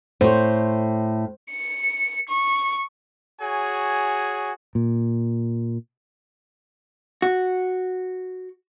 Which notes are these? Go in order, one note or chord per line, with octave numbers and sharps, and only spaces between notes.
A2 C5 C#5
C#7
C#6
F#4 G#4 C#5 G#5
A#2
F#4